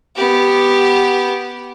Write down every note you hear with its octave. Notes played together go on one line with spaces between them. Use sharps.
B3 G4